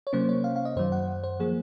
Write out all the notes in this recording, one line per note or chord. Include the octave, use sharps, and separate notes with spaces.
C#5
C3 F#3 A#3 C#4 C5
C#5
F5
F5
D#5
F#2 D#3 F#3 C5
F#5
C5
F3 A#3 G#4